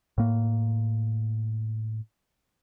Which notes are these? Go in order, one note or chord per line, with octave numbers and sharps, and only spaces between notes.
A2 A#3